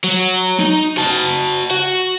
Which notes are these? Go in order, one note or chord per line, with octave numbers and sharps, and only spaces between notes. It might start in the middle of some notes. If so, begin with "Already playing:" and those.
F#3
D#4
F#4 A5
F#4